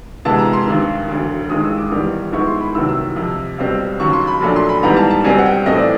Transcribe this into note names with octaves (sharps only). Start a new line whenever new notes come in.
D2 C3 E3 G#3 B3 A5
A#5
C6
G#1 G2 D#3
E1 D2 D3
A1 G2 D#3 G#3 D#6
E6
D6
A1 G#2 D#3 G3 B3
G#2 F3 G#3 B3 E4 C#6
C6
B5
C2 C3 D#3 F#3 B3 E6
E6
F2 C3 F3
C#2 B2 G3 C4
D#2 C#3 F#3 C#6
C6
B5
A#1 A#2 F#3 A3 D4
C6
B5
G#1 G#2 E3 G3 B3 A#5
A5
A5
C#2 B2 G3 C4 G#5
F#5
G5
B1 A2 E3 A3 C4 D#5
D5